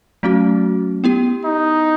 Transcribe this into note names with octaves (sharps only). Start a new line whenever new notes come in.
F#3 A3 C#4 F#4
B3 E4 G4
D#4